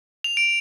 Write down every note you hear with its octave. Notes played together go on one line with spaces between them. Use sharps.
F7
D7